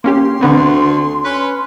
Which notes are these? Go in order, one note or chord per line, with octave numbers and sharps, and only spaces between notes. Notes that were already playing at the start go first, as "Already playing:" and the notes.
A#3 C#4 G4 C6
D2 D3 B3 C4
C#4 B4